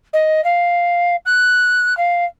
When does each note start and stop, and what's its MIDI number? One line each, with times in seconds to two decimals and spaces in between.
0.13 0.43 75
0.44 1.16 77
1.25 1.95 90
1.97 2.25 77